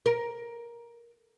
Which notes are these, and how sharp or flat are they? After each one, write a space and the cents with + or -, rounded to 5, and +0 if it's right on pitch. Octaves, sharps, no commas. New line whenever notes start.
A#4 +15